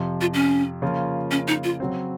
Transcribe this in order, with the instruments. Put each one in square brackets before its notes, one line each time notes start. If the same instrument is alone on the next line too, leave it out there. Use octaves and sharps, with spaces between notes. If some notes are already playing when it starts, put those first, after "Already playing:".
Already playing: [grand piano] F2 C3 F3
[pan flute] F4
C#4
[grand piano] C#3 F3 A#3 F4
[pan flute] C#4
D#4
F4
[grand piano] C#3 F#3 C4